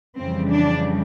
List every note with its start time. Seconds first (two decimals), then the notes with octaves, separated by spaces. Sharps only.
0.18 F2 C#3 E3 G3 C4
0.50 D4